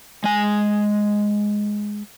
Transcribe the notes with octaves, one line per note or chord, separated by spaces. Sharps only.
G#3 G#5